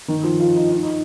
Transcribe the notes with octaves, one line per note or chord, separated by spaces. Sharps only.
D#3
F3
F4
D#4
D#4
D#4